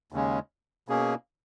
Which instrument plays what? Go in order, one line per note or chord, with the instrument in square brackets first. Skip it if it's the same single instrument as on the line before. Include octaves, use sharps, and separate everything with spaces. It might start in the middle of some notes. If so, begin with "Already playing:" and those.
[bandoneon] D#2 C#3 G#3 C#4
B2 A#3 C#4 G#4